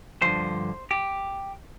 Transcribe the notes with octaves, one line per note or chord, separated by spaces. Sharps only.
G2 D3 F3 C5
G4